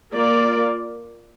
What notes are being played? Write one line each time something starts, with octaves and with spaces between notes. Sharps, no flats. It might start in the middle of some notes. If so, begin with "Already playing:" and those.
A#3 F4 A#4 D5